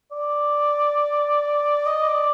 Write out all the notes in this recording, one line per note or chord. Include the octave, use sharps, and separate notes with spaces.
D5
D#5
D5